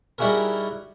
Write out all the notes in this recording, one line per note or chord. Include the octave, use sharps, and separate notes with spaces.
G3 D#4 E4 F#4 G#4 A#4